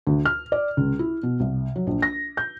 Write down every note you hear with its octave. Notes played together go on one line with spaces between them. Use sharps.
D2
F6
D5
C#2
E4
B2
C2
F#3
A#1
A#6
G6